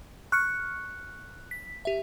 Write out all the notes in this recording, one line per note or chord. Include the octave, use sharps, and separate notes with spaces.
C#6 F6 F#6 C#7
B6
G4 E5